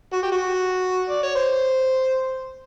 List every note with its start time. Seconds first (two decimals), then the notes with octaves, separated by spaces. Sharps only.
0.13 F#4
0.23 G4
0.32 F#4
1.10 D5
1.23 C#5
1.36 C5